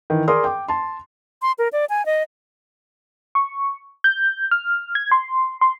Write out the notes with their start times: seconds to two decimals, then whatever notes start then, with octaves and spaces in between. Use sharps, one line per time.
0.10 D#3 E3
0.28 G#4 A#4 D5 C6 D#6
0.44 G5 D6
0.68 A5 C6
1.42 C6
1.59 A#4
1.73 D5
1.90 G#5
2.06 D#5
3.35 C#6
4.04 G6
4.51 F6
4.95 G#6
5.11 C6
5.61 C6